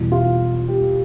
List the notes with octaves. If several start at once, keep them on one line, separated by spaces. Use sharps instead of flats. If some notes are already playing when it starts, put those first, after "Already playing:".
Already playing: E2 B2 G3
F4
G4